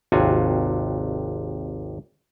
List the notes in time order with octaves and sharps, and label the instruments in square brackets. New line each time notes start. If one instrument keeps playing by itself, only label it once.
[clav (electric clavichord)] G#1 D#2 C3 F4 F#4 G#5